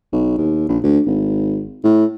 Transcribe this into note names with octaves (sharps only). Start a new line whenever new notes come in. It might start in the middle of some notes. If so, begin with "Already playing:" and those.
B1
D#2
A#1
D2
G#1
A2